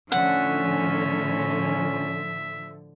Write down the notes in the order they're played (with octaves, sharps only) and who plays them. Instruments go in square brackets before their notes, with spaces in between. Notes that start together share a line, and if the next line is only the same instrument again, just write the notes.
[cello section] A2 D3 F3 [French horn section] C#4 [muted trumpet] E5 [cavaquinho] F#5